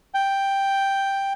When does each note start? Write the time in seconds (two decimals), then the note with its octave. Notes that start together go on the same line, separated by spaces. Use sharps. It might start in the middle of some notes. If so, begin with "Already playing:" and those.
0.14 G5